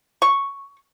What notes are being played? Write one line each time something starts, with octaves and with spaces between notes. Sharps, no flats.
C#6